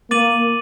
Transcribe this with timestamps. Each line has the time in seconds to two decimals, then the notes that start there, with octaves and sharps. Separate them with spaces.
0.11 A#3 D6 A6 D#7 F#7